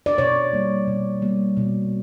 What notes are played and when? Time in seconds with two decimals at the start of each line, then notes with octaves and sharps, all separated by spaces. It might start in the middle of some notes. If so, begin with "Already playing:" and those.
0.06 D5
0.18 B2 C#5
0.53 G3 A#3
0.87 B2
1.22 G3 A#3
1.57 B2